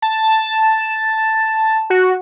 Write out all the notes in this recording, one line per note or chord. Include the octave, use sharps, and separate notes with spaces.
A5
F#4